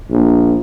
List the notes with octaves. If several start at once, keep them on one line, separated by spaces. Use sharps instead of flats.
A#1